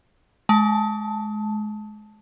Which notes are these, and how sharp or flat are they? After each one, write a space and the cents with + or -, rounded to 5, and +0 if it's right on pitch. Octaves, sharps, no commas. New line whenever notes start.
G#3 +30 A5 +0